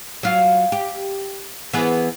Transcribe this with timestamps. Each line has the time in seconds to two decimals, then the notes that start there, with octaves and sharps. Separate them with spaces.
0.23 F#3 F4
0.72 G4
1.73 E3 B3 G#4